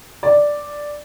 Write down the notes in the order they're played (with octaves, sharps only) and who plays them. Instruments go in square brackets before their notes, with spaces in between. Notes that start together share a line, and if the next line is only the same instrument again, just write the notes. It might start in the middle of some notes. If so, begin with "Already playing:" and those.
[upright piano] D5